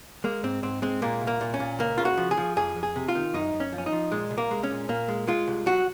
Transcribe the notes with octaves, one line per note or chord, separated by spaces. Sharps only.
G#3 A#3
G#2 C4
G#2 C4
G#3 C4
A#2 A#3
C2
A#3
A#2
C#4
A#2
C#2 A#3
C#3 F4
F#4
F3
G#4
F3
F2 G#4
F2
G#4
C3
F4
D#3
F#2 D#4
F#2
C#4
F3
C#4
D#4
F3
A#2 G#3
C2
A#3
G#3
C#4
A#2
A#2 A#3
G#3
G#3 F4
C2
F#3 F#4